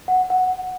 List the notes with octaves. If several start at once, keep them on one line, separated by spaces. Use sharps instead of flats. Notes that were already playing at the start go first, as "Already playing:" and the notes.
F#5
F#5